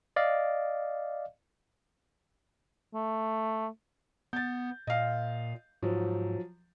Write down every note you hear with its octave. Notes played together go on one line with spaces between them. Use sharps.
D5 D#5 F5
A3
B3 G6 A6
A#2 D#5 F5
G#2 F3 F#3